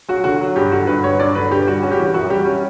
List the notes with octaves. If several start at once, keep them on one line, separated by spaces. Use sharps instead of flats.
F#3 F#4
D3 F#4
F#3
G2 G4
D3 F#4
G2 B4
F#3 C#5
G2 D5
D3 B4
G2 G4
G3 F#4
C#4 F#4
G4
E3 F#4
F#2 F#4
G3 G4
C#4